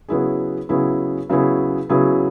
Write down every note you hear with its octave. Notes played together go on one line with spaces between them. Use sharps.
C#3 F#3 B3 E4 G#4
C#3 F#3 B3 E4 G#4
C#3 F#3 B3 E4 G#4
C#3 F#3 B3 E4 G#4